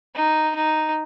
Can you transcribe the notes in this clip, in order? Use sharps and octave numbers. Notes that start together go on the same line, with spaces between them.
D#4
D#4